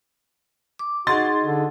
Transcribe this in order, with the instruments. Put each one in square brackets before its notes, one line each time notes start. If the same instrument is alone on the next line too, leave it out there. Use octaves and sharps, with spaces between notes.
[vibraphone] D6
[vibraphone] D#4 G#4 D#5 [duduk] F#4 [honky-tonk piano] C6 A6
[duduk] D3